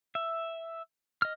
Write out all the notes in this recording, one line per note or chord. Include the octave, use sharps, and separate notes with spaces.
E5
D#5 F6